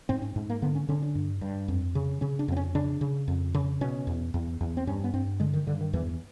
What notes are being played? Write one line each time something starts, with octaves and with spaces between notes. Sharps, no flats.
G#2 C4
C#4
G#2
A#3
D3 B3
C#4
D3 C#4
D4
G2
G2
F2
C#3
C#3 C#4
D4
F2 C4
C#4
C#3 D4
C#3
F2
C#3
B2 C#4
E2
E2
E2
C4
G2 C#4
B3
G2 C4
D3 G#3
D#3
G2 D3
D#3
E2 E3